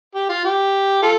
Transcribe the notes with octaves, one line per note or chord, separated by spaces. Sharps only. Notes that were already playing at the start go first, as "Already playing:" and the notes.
G4
F4
G4
F4 A4